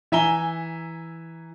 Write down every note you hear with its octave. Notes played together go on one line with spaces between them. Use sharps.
E3 E5 G#5 A#5 G7